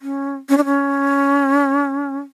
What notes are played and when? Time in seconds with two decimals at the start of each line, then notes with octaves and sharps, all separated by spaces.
0.02 C#4
0.49 C#4
0.58 D4
0.65 C#4